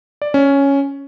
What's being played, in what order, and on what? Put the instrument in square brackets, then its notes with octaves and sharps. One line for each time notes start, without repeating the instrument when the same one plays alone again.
[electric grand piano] D5
C#4